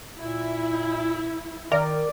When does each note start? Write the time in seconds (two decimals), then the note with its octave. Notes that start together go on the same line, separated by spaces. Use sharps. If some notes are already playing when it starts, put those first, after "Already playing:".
0.19 A#2 E4
1.72 D#3 A#4 D5